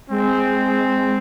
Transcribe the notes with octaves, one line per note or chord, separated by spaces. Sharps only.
G#3 C4